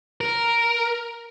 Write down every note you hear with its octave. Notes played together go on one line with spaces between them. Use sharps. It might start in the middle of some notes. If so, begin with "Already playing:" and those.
A#4